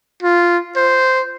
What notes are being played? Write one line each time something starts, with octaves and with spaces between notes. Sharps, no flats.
F4
C5